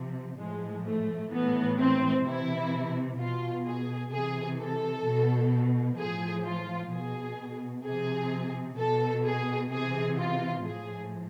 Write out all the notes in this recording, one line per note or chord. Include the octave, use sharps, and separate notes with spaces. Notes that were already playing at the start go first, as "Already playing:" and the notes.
Already playing: C3 F3
A2 F3 G#3
A3
A2 E3 B3
C4
C3 E3 E4
B2 F4
G#4
C3 E3 G#4
A4
B2
A2 F3 G#4
F4
B2 G#4
C3 F3 G#4
B2 A4
G#4
C3 E3 G#4
F4
A2 F3 G#4